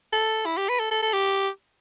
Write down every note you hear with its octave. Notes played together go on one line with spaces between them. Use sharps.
A4
E4
G4
B4
A4
A4
A4
G4